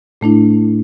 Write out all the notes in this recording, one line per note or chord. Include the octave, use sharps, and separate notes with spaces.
A2 A3 D4 E4